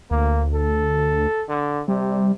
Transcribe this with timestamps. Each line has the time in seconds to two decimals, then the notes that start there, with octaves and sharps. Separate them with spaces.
0.11 D2 A#3
0.54 A4
1.49 D3
1.88 C3 G3